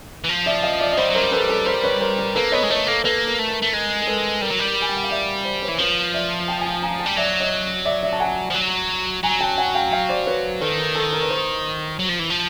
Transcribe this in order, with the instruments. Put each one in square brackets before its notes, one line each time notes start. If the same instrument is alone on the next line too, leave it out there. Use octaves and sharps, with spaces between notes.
[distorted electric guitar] E3
F3
[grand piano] D5 E5
D#5 F5
D5 E5
D#5
[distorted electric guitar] G3 [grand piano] C5 D5
[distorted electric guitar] F#3
[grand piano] A#4 C5
[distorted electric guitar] G3
[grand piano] A4 B4
A4 B4
A#4 C5
B4 C#5
A#4 C5
A#4
[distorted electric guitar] A#3 [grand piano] A4 B4
[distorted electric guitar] B3 [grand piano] C#5 D#5
[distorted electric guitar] G#3
[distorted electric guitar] A3 [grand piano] C#5 D#5
[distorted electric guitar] A#3 [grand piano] A4
[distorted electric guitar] A#3 [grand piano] A4 B4
[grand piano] A#4
[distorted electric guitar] A3
[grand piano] A#4
[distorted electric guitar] A3
[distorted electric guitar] G#3 [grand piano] A#4
[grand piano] A#4
A4 B4
[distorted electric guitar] G3 [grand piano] A#4
[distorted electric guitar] F#3
G3
[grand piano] A#4
G#5
G5
F#5
F5
D5 E5
C5 D5
B4 C#5
[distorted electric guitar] E3
[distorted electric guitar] F3 [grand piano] B4 C#5
[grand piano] D5 E5
G5 A5
G#5
G5 A5
G#5 A#5
G5 A5
[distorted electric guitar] G3
[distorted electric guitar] F#3 [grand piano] D5 E5
[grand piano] C#5 D#5
D5 E5
D5 E5
A5
F#5 G#5
[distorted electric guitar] F3
F#3
[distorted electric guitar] F#3 [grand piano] G#5 A#5
[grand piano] G5 A5
F#5 G#5
F5 G5
F5 G5
C5 D5
B4 C#5
[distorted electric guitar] D#3 [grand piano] A4 B4
[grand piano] A#4
A4
A#4
B4
A#4 C5
[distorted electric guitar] F#3
F3
E3
F3